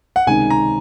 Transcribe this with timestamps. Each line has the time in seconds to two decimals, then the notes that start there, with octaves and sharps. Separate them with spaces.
0.16 F#5
0.27 C#2 C3 D#3 G#3 D#4 G#5
0.50 A#5